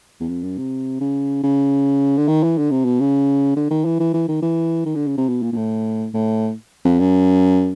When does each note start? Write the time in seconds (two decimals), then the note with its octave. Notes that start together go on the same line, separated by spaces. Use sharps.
0.20 E2
0.29 F2
0.43 F#2
0.58 C3
1.00 C#3
1.43 C#3
2.17 D3
2.28 D#3
2.43 E3
2.58 D3
2.71 C3
2.85 B2
3.00 C#3
3.56 D3
3.71 D#3
3.85 E3
4.00 E3
4.14 E3
4.28 D#3
4.42 E3
4.85 D#3
4.95 D3
5.07 C#3
5.17 C3
5.29 B2
5.42 A#2
5.52 A#2
5.57 A2
6.14 A2
6.85 F2
7.00 F#2